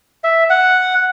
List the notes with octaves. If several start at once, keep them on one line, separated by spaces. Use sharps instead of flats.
E5
F#5